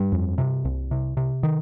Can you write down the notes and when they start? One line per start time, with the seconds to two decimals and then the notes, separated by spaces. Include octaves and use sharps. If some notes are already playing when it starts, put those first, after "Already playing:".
Already playing: G2 G3
0.12 F2
0.38 C3
0.65 C2
0.91 C3
1.17 C3
1.43 D#3